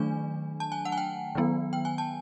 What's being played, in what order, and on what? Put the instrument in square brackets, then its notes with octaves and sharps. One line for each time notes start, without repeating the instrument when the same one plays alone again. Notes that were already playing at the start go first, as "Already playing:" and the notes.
Already playing: [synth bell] D#3 F#3 A3 D4 G#5
A5
G#5
F#5
G#5
G5
D#3 F#3 B3
G5
G#5
A5